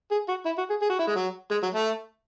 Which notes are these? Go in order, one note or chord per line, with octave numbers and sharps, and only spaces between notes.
G#4
F#4
E4
F#4
G#4
G#4
F#4
E4
G#3
F#3
G#3
F#3
A3